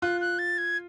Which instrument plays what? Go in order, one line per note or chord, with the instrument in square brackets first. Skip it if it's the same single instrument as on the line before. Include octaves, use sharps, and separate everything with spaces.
[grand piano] F4 [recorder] F#6
[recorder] F#6
A6
G#6